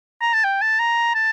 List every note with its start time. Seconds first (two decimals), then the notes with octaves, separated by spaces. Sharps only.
0.22 A#5
0.34 A5
0.44 G5
0.62 A5
0.79 A#5
1.15 A5